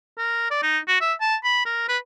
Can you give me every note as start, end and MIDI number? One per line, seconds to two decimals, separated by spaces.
0.18 0.45 70
0.51 0.61 74
0.62 0.78 63
0.88 0.96 66
1.01 1.13 76
1.21 1.36 81
1.44 1.63 83
1.65 1.88 70
1.89 1.98 71